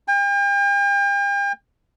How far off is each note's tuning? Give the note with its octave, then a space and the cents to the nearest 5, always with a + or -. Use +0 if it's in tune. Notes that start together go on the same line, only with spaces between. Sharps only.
G5 +40